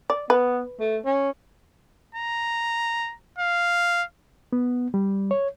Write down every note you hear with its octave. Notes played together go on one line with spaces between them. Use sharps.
D5
B3 B4
A3
C#4
A#5
F5
B3
G3
C#5